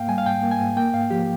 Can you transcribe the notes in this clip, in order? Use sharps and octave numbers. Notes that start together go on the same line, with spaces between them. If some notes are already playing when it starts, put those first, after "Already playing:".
Already playing: G#2 A#3 F5 G5
G3 G#5
F5
G#2 G5
A#3
G#5
G#2
A#3 G5
G#2 F5
F3 G4